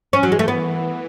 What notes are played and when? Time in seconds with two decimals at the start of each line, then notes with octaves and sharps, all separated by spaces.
0.13 E3 C#4
0.23 F#3
0.32 G#3
0.39 A3
0.48 B3